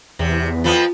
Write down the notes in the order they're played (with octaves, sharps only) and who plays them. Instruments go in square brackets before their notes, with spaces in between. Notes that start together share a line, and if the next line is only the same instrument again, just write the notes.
[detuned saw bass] E2 [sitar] C3
[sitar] F2 F3 B3 [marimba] F4